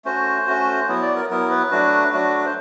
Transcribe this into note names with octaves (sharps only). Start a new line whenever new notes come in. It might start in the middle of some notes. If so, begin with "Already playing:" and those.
A3 C#4 F#4 C5
A3 C#4 F#4
F#3 B3 E4
D5
A#4
F#3 B3 E4 A#4
B4
F#3 A3 D4 F#4
F#3 A3 D4 F#4
C5